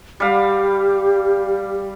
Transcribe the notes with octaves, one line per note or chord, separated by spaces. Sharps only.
G3 G4 F5